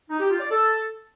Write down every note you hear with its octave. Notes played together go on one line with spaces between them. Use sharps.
D#4
G4
F4
D5
A4